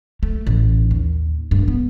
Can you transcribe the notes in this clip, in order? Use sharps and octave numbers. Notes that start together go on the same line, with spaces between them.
A3
A1
D#2
G2
B3